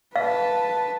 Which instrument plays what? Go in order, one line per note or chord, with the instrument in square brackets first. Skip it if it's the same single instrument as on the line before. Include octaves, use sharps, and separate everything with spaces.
[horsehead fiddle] B4 A5 [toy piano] F5